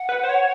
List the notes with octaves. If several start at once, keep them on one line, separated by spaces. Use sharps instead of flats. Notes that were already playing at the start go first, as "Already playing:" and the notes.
Already playing: F#5
B4
C5
C#5